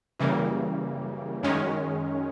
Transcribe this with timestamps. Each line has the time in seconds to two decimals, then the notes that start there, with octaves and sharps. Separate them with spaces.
0.20 F#2 C#3 E3 G3 A#3
1.43 F#2 D#3 G#3 C#4